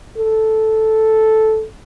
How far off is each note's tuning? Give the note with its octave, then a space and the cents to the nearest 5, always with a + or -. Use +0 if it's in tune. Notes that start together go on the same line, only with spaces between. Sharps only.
A4 -5